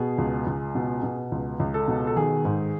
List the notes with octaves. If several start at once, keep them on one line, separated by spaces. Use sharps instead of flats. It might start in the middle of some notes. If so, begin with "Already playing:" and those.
Already playing: B2 G#4
C#2
C#2
B2
B2
C#2
C#2
A4
B2
A4
D#3 G#4
G#2